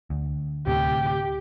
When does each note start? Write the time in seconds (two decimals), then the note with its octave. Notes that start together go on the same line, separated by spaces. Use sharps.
0.10 D2
0.67 D2 A2 C3 G4